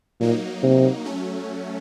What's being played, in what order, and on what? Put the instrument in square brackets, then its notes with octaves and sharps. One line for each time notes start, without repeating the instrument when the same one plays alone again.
[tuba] A#2 [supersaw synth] F#3 A#3 D#4
[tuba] C3
[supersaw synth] F#3 A3 C#4